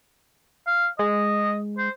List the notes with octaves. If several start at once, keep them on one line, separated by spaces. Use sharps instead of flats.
F5
G#3 D#5
C5